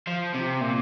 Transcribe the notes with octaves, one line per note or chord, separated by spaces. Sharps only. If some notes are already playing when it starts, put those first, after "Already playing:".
F3
C3
A#2